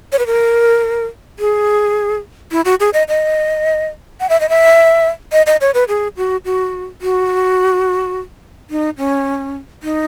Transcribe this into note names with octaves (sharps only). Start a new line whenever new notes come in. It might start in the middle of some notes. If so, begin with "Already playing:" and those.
C#5
B4
A#4
G#4
E4
F#4
G#4
D#5
D#5
F#5
E5
D#5
E5
D#5
D#5
C#5
B4
G#4
F#4
F#4
F#4
D#4
C#4
D#4